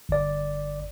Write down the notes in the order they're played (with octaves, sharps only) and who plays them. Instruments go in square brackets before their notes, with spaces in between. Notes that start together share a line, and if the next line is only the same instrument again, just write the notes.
[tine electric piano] G1 D5